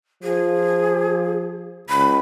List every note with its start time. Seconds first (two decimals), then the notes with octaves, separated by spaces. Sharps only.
0.23 F3 G#4
1.89 C#2 B5